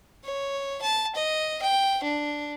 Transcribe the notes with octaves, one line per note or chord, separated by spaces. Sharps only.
C#5
A5
D#5
G5
D4